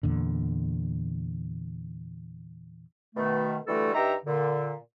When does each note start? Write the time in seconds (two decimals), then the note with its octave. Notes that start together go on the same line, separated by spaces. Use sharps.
0.03 E2 A#2 D3
3.15 B2 D#3 A3
3.67 D3 E3 G3 A3 F#4 A4
3.94 G2 D#4 G4 E5 A#5
4.26 A#2 D3